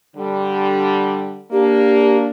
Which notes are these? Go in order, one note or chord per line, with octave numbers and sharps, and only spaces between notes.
D3 G3
A#3 D4 G4